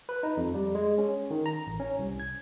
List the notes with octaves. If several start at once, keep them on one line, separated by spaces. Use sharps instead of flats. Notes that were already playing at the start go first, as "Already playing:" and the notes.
B4
D#4
F2
G3
G#3
C#4
D#3
A#5
A1
C#4
C2
G#6